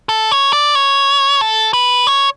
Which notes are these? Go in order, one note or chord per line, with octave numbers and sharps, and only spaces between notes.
A4
C#5
D5
C#5
A4
B4
C#5